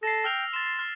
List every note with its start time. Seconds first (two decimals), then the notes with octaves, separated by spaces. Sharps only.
0.03 A4 E6 A#6 C7
0.24 G5 E6 F6 F7
0.53 C6 A6 E7
0.66 A6
0.79 F6